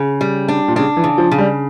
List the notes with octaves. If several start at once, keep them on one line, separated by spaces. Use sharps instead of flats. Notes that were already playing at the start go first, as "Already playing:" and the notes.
Already playing: C#3
G3
D4
A#2
C#3 D4
E3
C#3
F3
C#3
G3